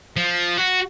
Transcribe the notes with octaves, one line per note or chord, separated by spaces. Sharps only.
F3
F#4